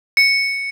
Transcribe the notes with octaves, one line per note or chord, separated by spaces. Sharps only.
C#7